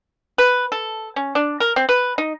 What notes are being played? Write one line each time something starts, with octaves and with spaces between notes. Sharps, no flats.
B4
A4
C#4
D4
A#4
C4
B4
D#4